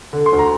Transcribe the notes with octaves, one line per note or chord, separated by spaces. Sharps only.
D3
C6
D2
A#5